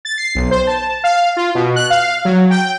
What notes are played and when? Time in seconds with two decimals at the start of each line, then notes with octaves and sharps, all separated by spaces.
0.05 A6
0.18 C7
0.35 B1
0.51 C5
0.67 A5
1.04 F5
1.37 F4
1.55 B2
1.76 F#6
1.90 F5
2.25 F#3
2.50 G5